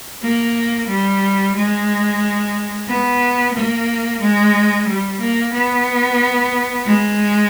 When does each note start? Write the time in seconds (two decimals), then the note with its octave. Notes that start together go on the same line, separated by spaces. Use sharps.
0.22 A#3
0.88 G3
1.56 G#3
2.88 B3
3.54 A#3
4.21 G#3
4.88 G3
5.20 A#3
5.53 B3
6.86 G#3